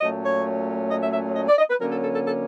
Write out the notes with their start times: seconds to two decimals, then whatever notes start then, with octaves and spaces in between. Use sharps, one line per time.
0.01 A#2 F#3 A3 C#4 D#5
0.24 C#5
0.91 D#5
1.02 E5
1.13 E5
1.36 D#5
1.48 D5
1.58 D#5
1.70 B4
1.80 D3 F#3 A#3 C#4 A#4
1.92 A4
2.03 A4
2.14 A4
2.25 A4